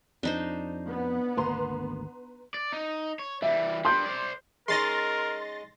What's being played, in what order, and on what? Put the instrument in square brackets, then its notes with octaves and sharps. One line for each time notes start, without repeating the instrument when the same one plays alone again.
[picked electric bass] F2 [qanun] D4 D#4 C5
[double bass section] B3
[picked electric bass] G#1 D2 A#3 [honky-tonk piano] B4 A#5 C6
[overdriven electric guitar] D5
D#4
C#5
[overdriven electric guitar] E3 G3 [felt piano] E5
[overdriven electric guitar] G3 D4 [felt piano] C6 G6
[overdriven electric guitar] C5 D5
[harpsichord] G#3 C#4 D#4 [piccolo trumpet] A#4 [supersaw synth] C6 A6 A#6